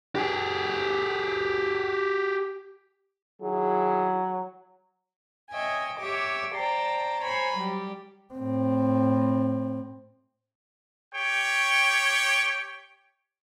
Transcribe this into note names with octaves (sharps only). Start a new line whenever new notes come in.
G4 G#4
D#3 F#3 E4 G#4
C#5 D#5 E5 G5 G#5
G4 C#5 E5 D6
C5 D5 G5 A5 A#5
C5 C#5 G#5 A#5 B5
F#3 G3 G4
A2 C4
G4 C#5 G5